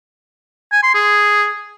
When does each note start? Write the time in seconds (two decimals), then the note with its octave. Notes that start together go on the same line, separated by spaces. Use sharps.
0.72 G#5
0.83 C6
0.95 G#4